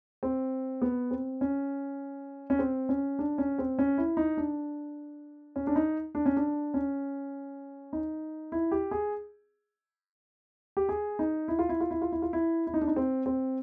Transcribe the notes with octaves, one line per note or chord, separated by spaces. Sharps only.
C4
B3
C4
C#4
C#4
C4
C#4
D4
C#4
C4
C#4
E4
D#4
D4
C#4
D4
D#4
D4
C#4
D4
C#4
D#4
E4
G4
G#4
G4
G#4
D#4
E4
F4
E4
F4
E4
F4
E4
F4
E4
E4
D#4
D4
D#4
C4
C4